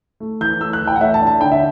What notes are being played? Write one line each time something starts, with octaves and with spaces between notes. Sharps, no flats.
A3
E3 G6
A3 E6
F#6
E3
G5
F#5
A3 E5
A5
D4
A5
D3 G5
E5